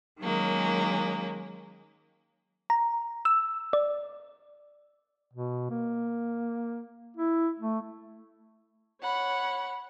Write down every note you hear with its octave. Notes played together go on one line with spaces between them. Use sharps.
D#3 F#3 G#3 A#3 C#4
A#5
E6
D5
B2
A#3
E4
A3
C#5 F#5 B5